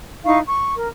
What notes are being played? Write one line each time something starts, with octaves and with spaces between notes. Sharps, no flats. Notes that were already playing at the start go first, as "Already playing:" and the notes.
D#4 E4 F5 C#6
C#6
A#4